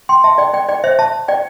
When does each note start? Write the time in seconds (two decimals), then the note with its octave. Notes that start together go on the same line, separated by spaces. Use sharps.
0.09 G5 C6
0.24 E5 A5
0.38 D5 G5
0.53 D5 G5
0.69 D5 G5
0.84 C5 E5
0.99 E5 A5
1.28 D5 G5